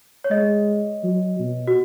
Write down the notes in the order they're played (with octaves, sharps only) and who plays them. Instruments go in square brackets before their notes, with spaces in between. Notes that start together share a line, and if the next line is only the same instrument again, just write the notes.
[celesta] C#5
[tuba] G#3 [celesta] D#5
[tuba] F#3
B2
[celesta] F#4